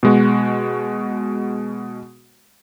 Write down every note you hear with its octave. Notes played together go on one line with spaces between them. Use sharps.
B2 G#3 F#4